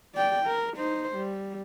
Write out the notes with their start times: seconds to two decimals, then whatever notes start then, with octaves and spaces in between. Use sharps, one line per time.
0.15 D5 G5
0.46 A#4
0.77 D#4 C5
1.16 G3